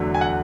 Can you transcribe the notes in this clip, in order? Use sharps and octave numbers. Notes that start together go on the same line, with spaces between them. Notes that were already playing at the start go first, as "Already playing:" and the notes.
Already playing: E2 D3 F#3 A3
G#5
F#5